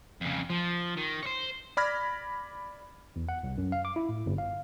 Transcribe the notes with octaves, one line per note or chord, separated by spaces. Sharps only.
F2 C#3
F3
D#3
C5 C#5
D5 B5 F6 G#6 A#6
E2
F#5
C2
F#2
F5
D6
E4
A2
G1
F5